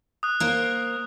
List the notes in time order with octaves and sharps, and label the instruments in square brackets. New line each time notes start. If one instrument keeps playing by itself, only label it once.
[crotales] D#6 F#6
[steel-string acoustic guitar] A#3 A#4 C5